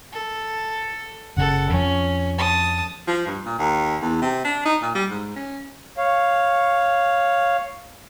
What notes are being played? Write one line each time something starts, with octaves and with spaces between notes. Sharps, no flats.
A4
F#1 C#3 A4 F#5
F2 F3 C#4
A5 D#6
F3
G2
A#2
D#2
E2
C3
D4
D#4
A#2
G3
G#2
C#4
C#5 F5